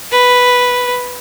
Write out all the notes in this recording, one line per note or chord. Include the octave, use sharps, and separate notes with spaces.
B4